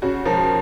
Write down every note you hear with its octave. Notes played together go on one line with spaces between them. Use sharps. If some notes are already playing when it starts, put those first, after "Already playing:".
C#3 F#4
F3 A#4